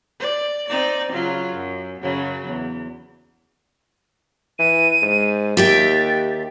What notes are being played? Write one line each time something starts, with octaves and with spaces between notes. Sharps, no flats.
D5
C4 D#4 D5
C#3 F#3 F4
F#2
F#2 C#3 F#3
E2
E3 D#7
G#2
D#2 G4 E5 G5 A6